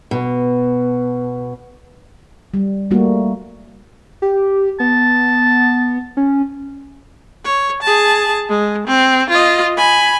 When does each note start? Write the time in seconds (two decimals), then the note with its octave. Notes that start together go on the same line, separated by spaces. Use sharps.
0.11 B2
2.54 G3
2.91 G3 A3 A#3 F#4
4.22 G4
4.80 B3 A5
6.17 C#4
7.44 C#5
7.82 G#4 A5
8.49 G#3
8.88 C4
9.30 F4 D#5
9.77 G#5 B5